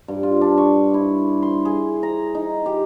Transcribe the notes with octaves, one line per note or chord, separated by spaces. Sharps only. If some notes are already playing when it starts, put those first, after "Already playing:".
G2
F4
D4
C#6
E4
C6
G#4
A#5
D#4
G4